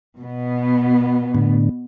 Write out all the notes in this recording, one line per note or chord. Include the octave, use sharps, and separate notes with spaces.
B2 B3
A2 D3